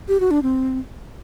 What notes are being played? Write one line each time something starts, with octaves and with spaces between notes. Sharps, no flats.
G4
F#4
D4
C4